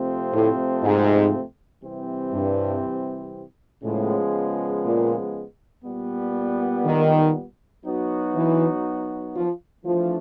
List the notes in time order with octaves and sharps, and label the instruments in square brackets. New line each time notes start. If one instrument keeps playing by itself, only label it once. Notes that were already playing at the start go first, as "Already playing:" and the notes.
Already playing: [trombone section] C3 F3 A3 C4
[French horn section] A2
G#2
[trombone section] C3 E3 G3 C4
[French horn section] G2
[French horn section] A2 [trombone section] C#3 F3 G#3 B3
[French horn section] A#2
[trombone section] A#2 G3 B3
[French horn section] D#3
[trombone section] F#3 B3 D#4 F#4
[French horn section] E3
F3
[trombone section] E3 A3 D4 F4 [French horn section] F3